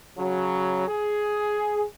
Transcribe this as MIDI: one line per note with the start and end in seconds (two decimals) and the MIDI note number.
0.17 0.85 49
0.17 0.85 54
0.88 1.83 68